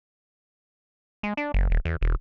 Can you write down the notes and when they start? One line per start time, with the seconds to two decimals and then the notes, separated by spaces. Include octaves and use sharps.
1.23 G#3
1.37 D4
1.54 F#1
1.70 D#1
1.85 E2
2.01 E1